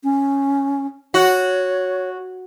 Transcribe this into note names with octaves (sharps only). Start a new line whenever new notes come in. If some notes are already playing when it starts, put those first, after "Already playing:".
C#4
F#4 C#5